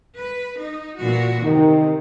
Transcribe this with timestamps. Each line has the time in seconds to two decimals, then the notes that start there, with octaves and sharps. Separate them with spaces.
0.16 B4
0.58 D#4
0.98 A#2 E3 F#4
1.43 C3 D#3